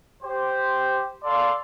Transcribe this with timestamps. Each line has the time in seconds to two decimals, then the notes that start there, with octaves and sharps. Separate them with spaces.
0.22 G4 C5
1.23 A4 D5 F5 C6